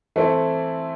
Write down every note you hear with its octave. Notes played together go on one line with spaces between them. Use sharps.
E3 A3 C4 E4 A4